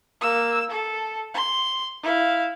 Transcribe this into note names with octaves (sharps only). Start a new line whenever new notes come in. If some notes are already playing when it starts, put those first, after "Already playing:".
A#3 E6
A4
C6
E4 F5